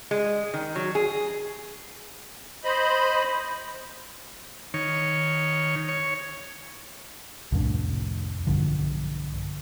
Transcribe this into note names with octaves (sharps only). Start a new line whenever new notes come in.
G#3
D#3
F#3
G#4
C5 D#5 B5
D#3 C#5
C#5
C2 F2 A2 D4
B1 G2 D3 F3